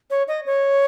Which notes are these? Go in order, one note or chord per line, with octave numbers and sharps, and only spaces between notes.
C#5
D#5
C#5